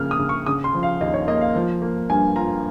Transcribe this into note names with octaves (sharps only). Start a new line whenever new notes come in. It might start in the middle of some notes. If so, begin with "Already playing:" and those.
Already playing: C#3 F3 A#3 F6
D#6
C#3
C#6
C#3 D#6
C6
F3
F5
D#2 D#5
C#5
A#3 D#5
F5
F3
A#3
G2 G#5
F4 A#5